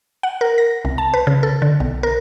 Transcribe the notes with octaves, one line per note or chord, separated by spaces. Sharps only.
F#5
A#4
A#6
C2
A5
B4
C#3
A4
D3
B1
A#4